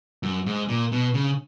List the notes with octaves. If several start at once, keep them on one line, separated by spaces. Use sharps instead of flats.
F#2
G#2
A#2
B2
C#3